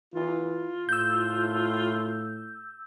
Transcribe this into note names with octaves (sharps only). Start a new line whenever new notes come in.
E3 F4
A2 E6 G6